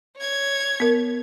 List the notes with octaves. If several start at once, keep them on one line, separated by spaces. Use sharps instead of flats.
C#5 G#6
B3 A#4